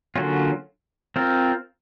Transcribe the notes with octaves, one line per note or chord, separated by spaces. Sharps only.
D3 F#3 A#3 C#4 F4
C4 F4 A#4